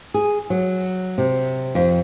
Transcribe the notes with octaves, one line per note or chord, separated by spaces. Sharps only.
G#4
F#3
C3
F2